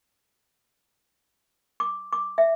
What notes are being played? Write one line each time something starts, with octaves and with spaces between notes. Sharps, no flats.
D6
D6
E5